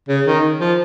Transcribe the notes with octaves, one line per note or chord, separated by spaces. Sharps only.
C#3
D#3
F3